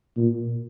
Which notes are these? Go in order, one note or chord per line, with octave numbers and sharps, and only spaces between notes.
A#2